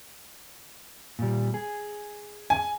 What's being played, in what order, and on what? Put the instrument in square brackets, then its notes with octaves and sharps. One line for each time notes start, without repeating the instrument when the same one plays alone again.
[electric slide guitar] A#2 G3
G#4
[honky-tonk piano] G#5